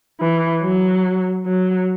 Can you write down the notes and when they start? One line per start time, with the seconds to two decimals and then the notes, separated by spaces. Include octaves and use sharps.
0.20 E3
0.61 F#3
1.46 F#3